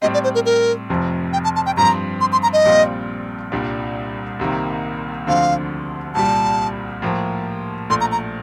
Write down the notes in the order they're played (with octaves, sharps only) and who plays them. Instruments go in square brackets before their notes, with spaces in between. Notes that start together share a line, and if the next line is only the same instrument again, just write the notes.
[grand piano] A2 G3 C4 [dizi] D#5
[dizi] D5
C5
A#4
A#4
[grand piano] F1 F2 C3 F3
[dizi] G5
A5
A5
G5
[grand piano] G2 F3 C4 [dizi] A#5
[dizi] C6
C6
A#5
D#5
[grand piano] A#1 A#2 G3 C4 F4
C2 A#2 G3 D4
C2 C3 D#3 A#3
[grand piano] D2 D3 F3 C4 [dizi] F5
[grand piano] C2 A#2 G3 [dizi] A5
[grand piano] A2 F3 A#3
[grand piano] A#1 A#2 A3 [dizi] C6
[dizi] A#5
A#5